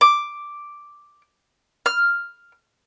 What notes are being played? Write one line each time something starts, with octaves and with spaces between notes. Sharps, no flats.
D6
F6